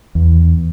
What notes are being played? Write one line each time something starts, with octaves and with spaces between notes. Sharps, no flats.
E2